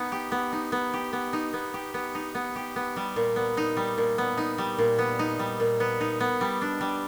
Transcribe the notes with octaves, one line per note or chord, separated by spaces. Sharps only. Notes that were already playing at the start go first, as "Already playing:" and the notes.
Already playing: B3 D#4
G4
B3
D#4
B3
G4
B3
D#4
B3
G4
B3
D#4
B3
G4
B3
G3
A#2
B3
D#4
G3
A#2
B3
D#4
G3
A#2
B3
D#4
G3
A#2
B3
D#4
B3
G3
D4
G3